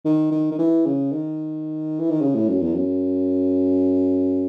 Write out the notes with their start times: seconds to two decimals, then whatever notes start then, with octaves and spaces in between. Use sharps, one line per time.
0.05 D#3
0.31 D#3
0.52 D#3
0.59 E3
0.86 C#3
1.12 D#3
1.99 E3
2.10 D#3
2.21 C#3
2.35 A2
2.48 F#2
2.62 E2
2.75 F#2